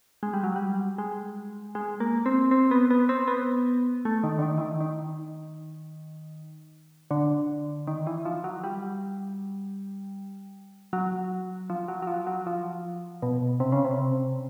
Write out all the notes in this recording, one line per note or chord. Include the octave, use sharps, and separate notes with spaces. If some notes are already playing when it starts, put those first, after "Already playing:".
G#3
G3
F#3
G3
G#3
G#3
A#3
C4
C4
B3
B3
C4
B3
A3
D#3
D3
D#3
E3
D#3
D#3
D3
D#3
E3
F3
F#3
G3
F#3
F3
F#3
F#3
F3
F#3
F3
B2
C3
C#3
C3